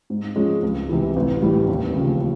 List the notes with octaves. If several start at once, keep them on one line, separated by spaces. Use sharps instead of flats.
G#2
F3 G#3 C#4
C#2
C3 E3
A1
A2 E3 G3
D#2
C#3 F3